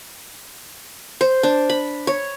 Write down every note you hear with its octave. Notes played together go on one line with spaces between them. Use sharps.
C5
D4
B5
C#5